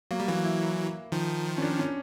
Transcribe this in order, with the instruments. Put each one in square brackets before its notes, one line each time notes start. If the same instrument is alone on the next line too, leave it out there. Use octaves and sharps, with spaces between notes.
[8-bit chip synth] F#3 [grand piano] A#3
[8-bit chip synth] G3
[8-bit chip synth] E3 F#3 [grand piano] A#3
[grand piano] E4
[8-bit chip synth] D#3 F3
[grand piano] C#4
D4
C#4